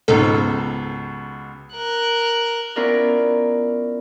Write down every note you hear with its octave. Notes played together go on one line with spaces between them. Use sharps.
C#2 G#2 B2 D#4 A4
A#4 F#6
B3 C#4 E4 F4 A#4 D5